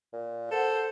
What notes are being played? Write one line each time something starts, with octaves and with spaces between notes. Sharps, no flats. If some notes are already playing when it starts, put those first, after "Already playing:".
A#2
A4 C5 F#5